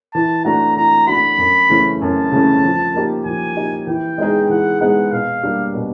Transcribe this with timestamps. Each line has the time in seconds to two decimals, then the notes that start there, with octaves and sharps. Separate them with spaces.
0.14 E3 A5
0.45 A3 D4 F#4 A#5
0.76 E3 A#5
1.07 A3 D4 F#4 B5
1.38 F#2
1.69 C#3 E3 A3 C#4
2.01 F#2 A5
2.31 C#3 E3 A3 C#4
2.63 F3
2.94 A#3 D#4 G4
3.25 F3 G#5
3.57 A#3 D#4 G4
3.87 E3 G5
4.18 G#3 B3 D#4 G#4
4.49 E3 F#5
4.80 G#3 B3 D#4 G#4 F#5
5.12 B2 F5
5.43 G3 A#3 D4 G4
5.74 B2